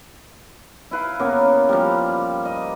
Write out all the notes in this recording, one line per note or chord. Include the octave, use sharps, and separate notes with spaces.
E4 B4 F5
C#3 A#3 B3 A#4
F3 G3
D#5